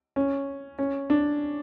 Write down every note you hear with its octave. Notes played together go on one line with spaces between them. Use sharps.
C#4
C#4
D4